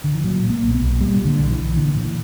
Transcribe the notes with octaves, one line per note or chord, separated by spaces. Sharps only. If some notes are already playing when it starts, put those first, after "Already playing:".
D3
E3
A#2 F#3
A#2
A#3
B1
B3
B1
A#2 G3
A#2
D3
B1
E3
B1
A#2 D3
A#2 E3